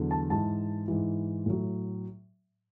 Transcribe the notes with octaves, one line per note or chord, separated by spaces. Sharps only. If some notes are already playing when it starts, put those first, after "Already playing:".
Already playing: E2 D3 F#3
A5
G#2 E3 A5
G#2 E3
A2 F#3